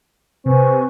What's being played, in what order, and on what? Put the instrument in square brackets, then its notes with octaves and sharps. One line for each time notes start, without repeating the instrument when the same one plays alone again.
[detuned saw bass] C3 [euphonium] C4 [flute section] B4 G#5 C#6